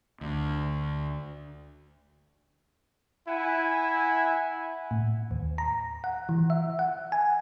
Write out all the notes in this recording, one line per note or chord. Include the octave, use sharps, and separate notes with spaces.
D2
E4 E5 F#5 G#5
A2
D#2
A#5
F#5
E3
E5
F#5
G#5